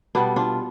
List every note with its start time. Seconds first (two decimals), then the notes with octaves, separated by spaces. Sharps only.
0.15 B2 G3 B3 D4
0.36 D4 F4